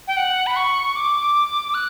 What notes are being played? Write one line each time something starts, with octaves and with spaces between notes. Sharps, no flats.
G5
F#5
B5
C#6
D6
F#6